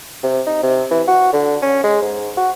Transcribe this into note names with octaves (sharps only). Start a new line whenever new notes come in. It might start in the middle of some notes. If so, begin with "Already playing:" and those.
C3
D#4
C3
E3
F#4
D3
C#4
G#3
G#2
F#4